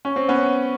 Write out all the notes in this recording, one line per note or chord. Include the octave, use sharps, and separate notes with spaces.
C#4
C4
B3 C#4